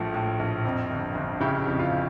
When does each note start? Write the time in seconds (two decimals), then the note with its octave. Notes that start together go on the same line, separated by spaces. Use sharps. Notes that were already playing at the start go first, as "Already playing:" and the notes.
Already playing: A#1 A2 F3 A3
0.14 A2
0.39 A#1
0.65 F2
0.90 G1
1.15 G1
1.40 C#3 E4 G4
1.66 F2
1.79 F4